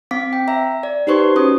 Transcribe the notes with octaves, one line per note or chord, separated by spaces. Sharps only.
C4 F5 D6 B6
G5
E5 A#5
D5
D#4 G4 B4 C5 C6 C#6
C#4 F#4 C5 D#6